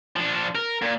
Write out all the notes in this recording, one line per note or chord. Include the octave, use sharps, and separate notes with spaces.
F3 D4
A#4
A#2